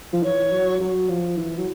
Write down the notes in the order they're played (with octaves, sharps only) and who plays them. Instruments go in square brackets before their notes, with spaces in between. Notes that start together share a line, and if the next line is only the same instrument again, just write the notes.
[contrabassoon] F3
[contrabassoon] E3 [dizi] C#5
[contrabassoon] F#3
F#3
F3
E3
F#3